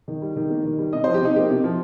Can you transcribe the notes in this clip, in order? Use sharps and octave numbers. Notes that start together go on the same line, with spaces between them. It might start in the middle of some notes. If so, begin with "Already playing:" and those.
D#3
G3
D#3
A#3
D#3
G3
C3 D#5
F3 C5
G4
C3 D#4
A#3 G4
C3
F3